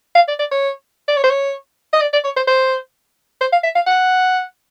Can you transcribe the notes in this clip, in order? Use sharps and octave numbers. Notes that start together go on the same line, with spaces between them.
F5
D5
D5
C#5
D5
C#5
C5
C#5
D#5
D5
D5
C#5
C5
C5
C5
F5
E5
F5
F#5